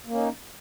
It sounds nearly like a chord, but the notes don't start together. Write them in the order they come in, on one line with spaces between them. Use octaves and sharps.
A#3 C#4 D#4